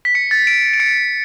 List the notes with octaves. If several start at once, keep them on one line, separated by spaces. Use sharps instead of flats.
B6
C#7
A6
D7
D7
C#7